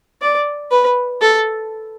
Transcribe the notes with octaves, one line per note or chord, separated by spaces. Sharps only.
D5
B4
A4